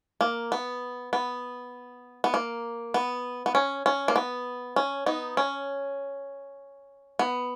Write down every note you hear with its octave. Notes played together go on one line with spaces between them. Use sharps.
A#3
B3
B3
B3
A#3
B3
B3
C#4
C#4
A#3
B3
C#4
B3 D#4
C#4
B3